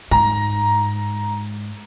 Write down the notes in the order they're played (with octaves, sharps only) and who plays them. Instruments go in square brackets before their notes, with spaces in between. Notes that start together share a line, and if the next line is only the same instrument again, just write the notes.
[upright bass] G#2 [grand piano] A#5